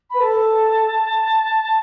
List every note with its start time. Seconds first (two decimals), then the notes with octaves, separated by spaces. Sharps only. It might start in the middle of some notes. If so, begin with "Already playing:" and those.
0.09 B4 B5
0.20 A4 A5